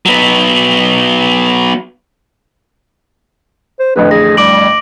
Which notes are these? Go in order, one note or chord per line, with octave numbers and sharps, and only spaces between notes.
F#3 B3
C5
A1 F2 D3 B4
G#4 A#6
G3 D6 D7 F#7